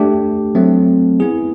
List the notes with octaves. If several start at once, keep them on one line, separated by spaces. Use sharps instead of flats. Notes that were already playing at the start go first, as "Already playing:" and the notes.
Already playing: A3 D4 G4
F#3 A3 C4
B3 E4 G#4